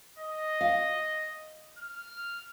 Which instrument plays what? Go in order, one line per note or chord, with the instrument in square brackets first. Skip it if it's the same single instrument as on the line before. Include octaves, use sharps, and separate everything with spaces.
[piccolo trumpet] D#5
[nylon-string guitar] F5
[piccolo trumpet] F6